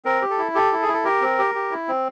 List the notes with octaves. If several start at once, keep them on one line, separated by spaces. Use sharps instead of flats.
C4 A#4
G4
A4
E4
G4 A4
E4
G#4
E4
A4
G4 A#4
C4
G4
G4
E4
C4